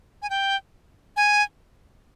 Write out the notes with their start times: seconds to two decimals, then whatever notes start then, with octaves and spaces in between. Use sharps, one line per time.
0.22 G#5
0.30 G5
1.17 G#5